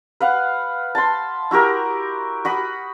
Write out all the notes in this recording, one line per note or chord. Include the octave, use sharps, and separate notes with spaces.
B4 F5 F#5
A5 B5 C6
E4 F#4 G4 A#4
F#4 B5 D#6